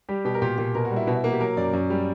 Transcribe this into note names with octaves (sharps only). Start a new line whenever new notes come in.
G3 G4
B2 G4
A#4
A#2 G4
A#2
B2 A#4
F#4
G3
E4
B2 F#4
E4
A#3 F#4
G4
F#3 A#4
F#2 D5
F#2
G3